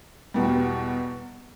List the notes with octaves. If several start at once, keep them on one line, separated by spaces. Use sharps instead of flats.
E2 B2 G3